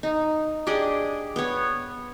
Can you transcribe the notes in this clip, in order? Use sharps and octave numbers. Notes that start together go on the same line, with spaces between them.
D#4
D4 G4 G#4 D#5
B3 C#5